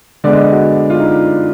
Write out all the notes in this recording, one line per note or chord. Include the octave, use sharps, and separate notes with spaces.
D3 G#3 B3 D5
D#5
D#5
F#4
F4
D#4